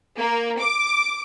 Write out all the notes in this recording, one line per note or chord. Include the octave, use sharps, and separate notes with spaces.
A#3
D6